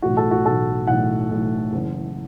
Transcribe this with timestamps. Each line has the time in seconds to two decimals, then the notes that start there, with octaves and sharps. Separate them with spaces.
0.02 B1 A2 E3 F#4
0.17 A4
0.31 F#4
0.45 B1 A2 E3 A4
0.87 B1 A2 E3 F#5
1.30 B1 A2 E3
1.73 F#1 F#2 E3